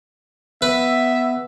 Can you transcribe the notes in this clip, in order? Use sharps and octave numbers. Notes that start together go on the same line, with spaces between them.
B3 B4 E5